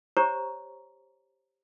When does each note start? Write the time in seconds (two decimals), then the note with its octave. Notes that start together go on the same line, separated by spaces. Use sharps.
0.17 G4 C5 C#5 A#5 C#6